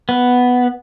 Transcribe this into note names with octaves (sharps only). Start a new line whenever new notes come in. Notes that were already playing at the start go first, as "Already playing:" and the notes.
B3